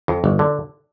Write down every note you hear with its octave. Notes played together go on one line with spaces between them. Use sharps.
F2
G1
D3